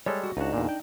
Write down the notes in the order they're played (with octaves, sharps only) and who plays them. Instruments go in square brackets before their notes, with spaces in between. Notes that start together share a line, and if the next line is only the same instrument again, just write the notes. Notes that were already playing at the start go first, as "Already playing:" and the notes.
[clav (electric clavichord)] G3 G#3 A4 [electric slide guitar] C#5
[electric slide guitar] F#4
[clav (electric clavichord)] C#2 F#4 [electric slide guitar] D4 D#4
[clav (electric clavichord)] E2 A#2
G5